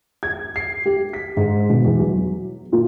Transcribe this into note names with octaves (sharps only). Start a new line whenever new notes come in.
G#6
C7
G4
B6
G#2
B2
E2
F#3
A#2